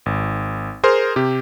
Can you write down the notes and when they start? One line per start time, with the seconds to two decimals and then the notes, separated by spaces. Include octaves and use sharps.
0.06 G#1
0.83 G#4 A#4 C5 C6 F6
1.16 C3 G4